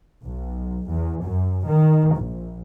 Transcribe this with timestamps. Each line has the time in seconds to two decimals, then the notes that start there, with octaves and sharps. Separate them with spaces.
0.24 B1
0.89 E2
1.25 F#2
1.68 D#3
2.17 A#1